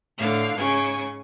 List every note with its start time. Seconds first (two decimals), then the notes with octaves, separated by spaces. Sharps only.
0.17 A2 D3 F5 F6
0.55 G#2 C#3 G#5 C#6